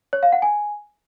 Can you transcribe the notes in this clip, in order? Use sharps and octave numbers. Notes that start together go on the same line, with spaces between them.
C#5
F5
F#5
G#5